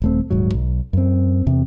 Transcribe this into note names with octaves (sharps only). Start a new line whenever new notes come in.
D#1 A3 C4
D#1 G#2 F#3
B1
F#2 C4
E2 C3